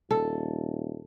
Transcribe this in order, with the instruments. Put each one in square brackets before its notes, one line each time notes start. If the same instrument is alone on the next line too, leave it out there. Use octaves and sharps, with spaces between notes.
[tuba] D#1 [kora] A4